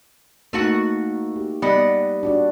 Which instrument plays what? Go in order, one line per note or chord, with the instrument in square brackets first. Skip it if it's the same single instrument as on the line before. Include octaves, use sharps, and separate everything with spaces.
[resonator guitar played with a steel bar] A3 F#4 F#5 [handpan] A#3 D#4
[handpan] G4
[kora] G3 [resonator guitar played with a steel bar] B3 D#5 F#5
[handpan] D4 F#4 D5